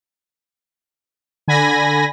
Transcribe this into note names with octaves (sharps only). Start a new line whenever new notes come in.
D3 G#5 B5 A#6